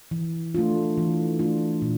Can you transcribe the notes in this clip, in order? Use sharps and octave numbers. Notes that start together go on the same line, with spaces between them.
E3
A3 D4 F4
E3
A3 D4 F4
A#2